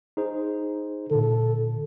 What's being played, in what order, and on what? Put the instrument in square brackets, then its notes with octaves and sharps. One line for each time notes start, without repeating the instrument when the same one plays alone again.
[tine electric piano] D#4 G#4 C5
[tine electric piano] A#2 D3 [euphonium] A4